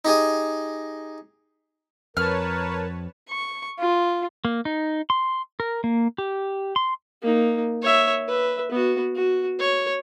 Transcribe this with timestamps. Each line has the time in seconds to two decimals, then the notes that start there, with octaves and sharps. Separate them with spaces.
0.05 D#4 G4 G#4 D#5
2.17 F2 A#4 B4 C#5 A5 F6
3.29 C#6
3.79 F4
4.45 A#3
4.65 D#4
5.10 C6
5.60 A#4
5.84 A#3
6.18 G4
6.76 C6
7.22 A#3 D#4
7.82 C#5 E5
8.28 B4 E5
8.71 B3 F#4
9.15 F#4
9.59 C#5